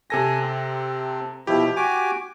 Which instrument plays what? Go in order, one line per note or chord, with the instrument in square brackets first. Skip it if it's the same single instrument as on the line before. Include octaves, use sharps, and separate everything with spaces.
[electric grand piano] C3 A4 A#6 [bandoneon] G#5
[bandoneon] C4
[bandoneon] B2 F3 E4 [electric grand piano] G4
[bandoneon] F#4 G#5 D6